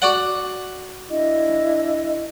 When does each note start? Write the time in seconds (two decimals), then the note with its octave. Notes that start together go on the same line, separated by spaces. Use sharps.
0.02 F#4 D5 F#5
1.09 D4 E4 D#5